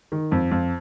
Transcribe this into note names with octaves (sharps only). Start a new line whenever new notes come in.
D#3
F2
F2